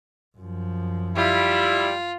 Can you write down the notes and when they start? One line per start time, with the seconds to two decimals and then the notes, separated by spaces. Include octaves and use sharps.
0.38 F#2 F3
1.16 G3 E4 F4